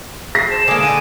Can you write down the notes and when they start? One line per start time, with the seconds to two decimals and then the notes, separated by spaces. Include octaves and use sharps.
0.35 G#4 A#6 C7
0.51 C5 A5 E7
0.68 D3 A#3 G#4 G#5 D6
0.83 D3 D#7